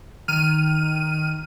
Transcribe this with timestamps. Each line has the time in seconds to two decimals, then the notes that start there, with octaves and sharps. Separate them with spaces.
0.28 D#3 F6 D#7